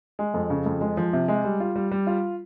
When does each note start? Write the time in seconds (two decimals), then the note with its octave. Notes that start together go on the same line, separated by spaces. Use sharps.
0.19 G#3
0.34 F2
0.50 C#3
0.66 F2
0.81 G#3
0.97 F3
1.13 C3
1.28 G#3
1.44 G3
1.60 F4
1.76 G3
1.91 G3
2.07 F4